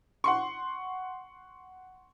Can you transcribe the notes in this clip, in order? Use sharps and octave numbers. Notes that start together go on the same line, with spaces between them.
F#5 C6 C#6